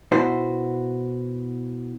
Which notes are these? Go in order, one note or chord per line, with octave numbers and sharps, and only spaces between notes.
B2 E4 F#4 C5